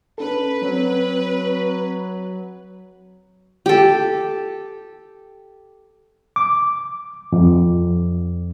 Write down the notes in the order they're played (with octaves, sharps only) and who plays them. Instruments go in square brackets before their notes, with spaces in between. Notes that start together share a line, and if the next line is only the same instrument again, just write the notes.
[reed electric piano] C#4 D4 A4 [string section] B4
[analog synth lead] F#3 [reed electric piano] C4
[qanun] G4 A4
[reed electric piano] D6
F2